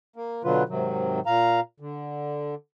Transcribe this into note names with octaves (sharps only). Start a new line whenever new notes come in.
A#3
B2 D3 F#3 F4 B4
G#2 C3 D#3 F#3
A#2 F5 A#5
D3